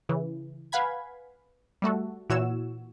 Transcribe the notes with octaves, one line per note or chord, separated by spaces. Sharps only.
C#3 E3
B4 F5 F#5 G#5 B5 G#6
G3 A3 F#4 A4
A#2 E3 F#4 C#5 E6